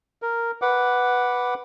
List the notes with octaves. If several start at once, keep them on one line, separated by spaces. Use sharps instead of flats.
A#4
B4 F#5 D6